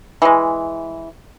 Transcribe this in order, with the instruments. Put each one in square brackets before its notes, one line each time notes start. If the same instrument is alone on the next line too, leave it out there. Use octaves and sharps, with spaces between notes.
[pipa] E3 G#3